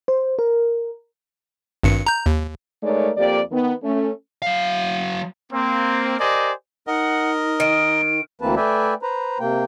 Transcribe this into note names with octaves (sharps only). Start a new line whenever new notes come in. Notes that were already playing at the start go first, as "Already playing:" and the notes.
C5
A#4
G#1 G2 C#7
A#5 G6
D#2
G#3 A3 D#4 A#4 C#5 D5
F2 A#3 G4 D5
D#3 B3
A3 C#4
F#3 F5
A#3 C4
G4 A#4 C5 D5 D#5 G#5
D#4 A#4 D#5 F#5
D#3 D7
D2 E3 A#3 C4 B4 A5
A3 B4 D5 E5 G5 G#5
B4 C5 A#5
C3 A#3 G5